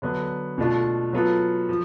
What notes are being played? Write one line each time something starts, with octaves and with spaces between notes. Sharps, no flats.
D3 F#3 B3 D4
B2 A3 D4 F4
F#3 B3 F4 A4
F3